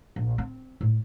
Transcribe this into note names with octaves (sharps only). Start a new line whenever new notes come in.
A#1
C4
A2